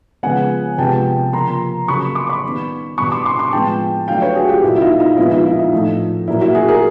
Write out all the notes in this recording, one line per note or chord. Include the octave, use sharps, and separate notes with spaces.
C#3 F3 G#3 B3 F#5 G#5
C3 F3 G#3 B3 G5 A5
C#3 F3 A#3 A#5 C6
C#3 F#3 A#3 B5 C#6
C6 D6
B5 C#6
D#3 G3 B3
B2 G3 B3 B5 C#6
C6 D6
C6 D6
C6 D6
A2 F3 G#3 B3 G5 A5
D3 F#3 A3 F5 G5
B4 C#5
F#4 G#4
F4 G4
A#2 F#3 A#3 E4 F#4
E4
D#4 F4
D#4 F4
A#2 F3 G#3 B3 E4
D#4 F4
E4
D#4
A2 F3 A3 D#4
A#2 F#3 A#3 E4
E4 F#4
F#4 G#4
G#4 A#4